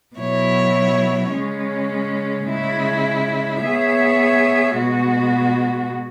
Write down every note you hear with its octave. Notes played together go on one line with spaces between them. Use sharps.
B2 F#3 E4 C#5
C#3 G#3 C#4
C#3 G#3 E4
B3 G#4 C#5 E5
B2 G#3 B3 F#4